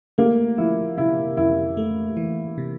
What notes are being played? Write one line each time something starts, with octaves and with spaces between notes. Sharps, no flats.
A3 A#3
F3 E4
C3 E4
F2 E4
A3
E3
C3